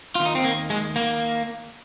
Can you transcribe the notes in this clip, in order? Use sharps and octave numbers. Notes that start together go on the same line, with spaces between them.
D#2 D#3 F4
D#4
C4
A#3
G#3
A#3